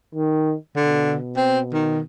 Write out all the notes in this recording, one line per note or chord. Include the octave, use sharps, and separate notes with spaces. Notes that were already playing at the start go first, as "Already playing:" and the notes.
D#3
B2 D3
C4
D#3